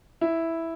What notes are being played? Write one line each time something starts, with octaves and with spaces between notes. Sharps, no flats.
E4